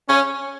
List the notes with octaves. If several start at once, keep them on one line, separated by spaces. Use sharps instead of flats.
C#4